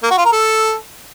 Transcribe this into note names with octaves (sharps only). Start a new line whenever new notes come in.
A#3
F#4
F4
A#4
A4